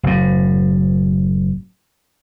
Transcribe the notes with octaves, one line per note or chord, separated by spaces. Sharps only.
F#1 A2